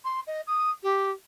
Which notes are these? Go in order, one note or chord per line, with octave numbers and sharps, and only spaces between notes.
C6
D#5
D#6
G4